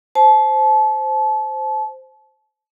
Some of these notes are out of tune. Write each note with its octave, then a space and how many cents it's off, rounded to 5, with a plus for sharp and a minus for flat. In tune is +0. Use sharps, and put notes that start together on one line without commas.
C5 +0 A5 -30